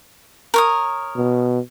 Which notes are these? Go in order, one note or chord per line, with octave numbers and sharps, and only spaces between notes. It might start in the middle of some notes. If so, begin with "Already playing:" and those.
A#4 C#5 D#6
B2